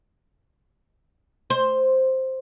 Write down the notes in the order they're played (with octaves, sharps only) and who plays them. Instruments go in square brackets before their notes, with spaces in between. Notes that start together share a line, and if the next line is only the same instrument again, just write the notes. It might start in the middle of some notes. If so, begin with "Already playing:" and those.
[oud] C5